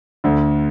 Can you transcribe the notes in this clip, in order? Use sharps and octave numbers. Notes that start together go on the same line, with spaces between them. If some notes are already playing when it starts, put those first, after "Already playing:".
D2 D3